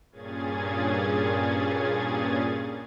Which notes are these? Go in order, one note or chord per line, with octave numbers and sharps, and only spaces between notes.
G2 A#2 C#4 G#4 G#6 A6